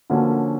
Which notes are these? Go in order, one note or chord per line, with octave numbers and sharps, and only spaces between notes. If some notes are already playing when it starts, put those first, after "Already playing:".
D3 F3 A#3 C#4 F#4